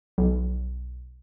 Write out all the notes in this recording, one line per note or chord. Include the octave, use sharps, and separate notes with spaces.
B1